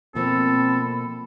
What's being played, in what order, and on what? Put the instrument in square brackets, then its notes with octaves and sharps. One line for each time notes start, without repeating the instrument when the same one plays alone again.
[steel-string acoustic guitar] B2 F3 A#3 [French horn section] C4 [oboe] A4 [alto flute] B5